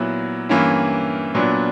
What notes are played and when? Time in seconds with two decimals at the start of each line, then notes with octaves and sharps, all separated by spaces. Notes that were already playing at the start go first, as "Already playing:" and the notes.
Already playing: A#2 F#3 B3 E4
0.49 G2 E3 A#3 C#4 E4
1.35 A#2 F#3 B3 D4